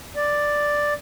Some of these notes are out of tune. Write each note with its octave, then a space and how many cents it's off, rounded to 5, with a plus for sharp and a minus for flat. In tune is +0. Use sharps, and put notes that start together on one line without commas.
D5 +5